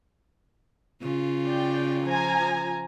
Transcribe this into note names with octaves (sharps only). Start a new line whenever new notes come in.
C#3 F4
D5 G5
F3 G#5 A#5